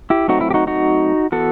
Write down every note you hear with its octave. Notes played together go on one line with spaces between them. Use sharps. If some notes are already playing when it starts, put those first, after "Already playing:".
E4 G4
F#3 A3 C4 D#4 F#4
E4
G4
D#4 F#4
D#4 F#4
E3 B3 F#4 A4